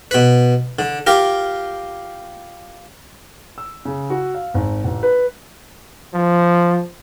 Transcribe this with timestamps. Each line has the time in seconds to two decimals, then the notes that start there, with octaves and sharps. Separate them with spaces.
0.11 B2 B4
0.79 D3
1.07 F4 G4 A#4
3.58 E6
3.85 C#3
4.10 F#4
4.35 F5
4.54 G#1
4.84 A1
5.03 B4
6.14 F3